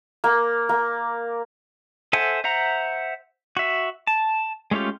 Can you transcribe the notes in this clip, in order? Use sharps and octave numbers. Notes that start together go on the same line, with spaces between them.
A#3
A#3
A4 C5 E5 F#5 G#5
C5 E5 F#5 A#5
F#4 E5
A5
G#3 A3 C#4 F4 G4